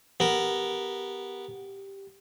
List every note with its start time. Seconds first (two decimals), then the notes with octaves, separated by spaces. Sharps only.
0.20 B3 G4 A#4